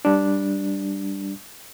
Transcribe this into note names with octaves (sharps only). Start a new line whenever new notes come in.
G3 D4